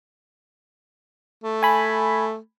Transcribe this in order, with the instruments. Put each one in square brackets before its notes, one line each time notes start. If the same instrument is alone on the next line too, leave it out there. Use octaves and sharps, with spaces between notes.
[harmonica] A3
[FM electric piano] G#5 B5